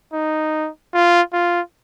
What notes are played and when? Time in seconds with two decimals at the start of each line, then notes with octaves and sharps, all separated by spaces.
0.14 D#4
0.94 F4
1.33 F4